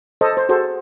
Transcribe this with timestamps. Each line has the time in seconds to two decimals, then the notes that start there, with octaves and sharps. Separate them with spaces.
0.21 A4 C5 D#5
0.37 C5
0.49 F#4 G#4 A4 C5